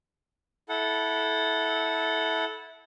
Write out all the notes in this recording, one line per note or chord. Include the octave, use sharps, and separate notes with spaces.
E4 A4 F#5